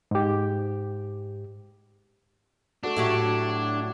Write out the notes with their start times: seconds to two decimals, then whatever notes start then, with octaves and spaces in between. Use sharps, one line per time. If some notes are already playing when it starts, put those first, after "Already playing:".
0.11 G#2 G4
2.84 A3 D4 F#4
2.96 A2 F#3 A3 F#4 G4 C#6